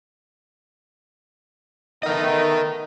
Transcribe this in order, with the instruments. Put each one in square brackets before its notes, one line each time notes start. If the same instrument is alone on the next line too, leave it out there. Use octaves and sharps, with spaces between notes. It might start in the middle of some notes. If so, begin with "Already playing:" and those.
[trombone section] A3 B3 D#4 [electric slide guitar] A#4 D#5